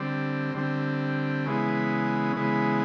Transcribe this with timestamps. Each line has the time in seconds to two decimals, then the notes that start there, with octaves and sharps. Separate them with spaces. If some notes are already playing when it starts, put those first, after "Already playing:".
Already playing: D3 G3 C4
0.55 D3 G3 C4
1.45 C#3 E3 G#3 B3
2.36 C#3 E3 G#3 B3